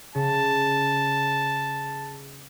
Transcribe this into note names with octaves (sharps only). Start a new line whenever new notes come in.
C#3 A5